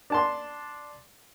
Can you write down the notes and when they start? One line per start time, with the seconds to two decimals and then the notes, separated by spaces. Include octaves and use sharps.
0.10 D4 A5 C6